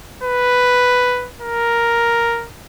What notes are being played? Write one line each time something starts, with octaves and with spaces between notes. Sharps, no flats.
B4
A#4